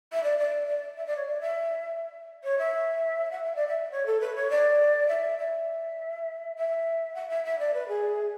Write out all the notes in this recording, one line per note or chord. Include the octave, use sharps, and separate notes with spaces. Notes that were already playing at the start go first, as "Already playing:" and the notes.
E5
D5
D5
D5
E5
D5
C#5
D5
E5
C#5
E5
F#5
E5
D5
E5
C#5
A4
B4
C#5
D5
E5
E5
E5
F#5
E5
E5
D5
B4
G#4